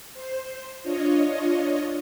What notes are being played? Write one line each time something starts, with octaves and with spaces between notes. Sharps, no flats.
C5
D4 F4 C#5 D#5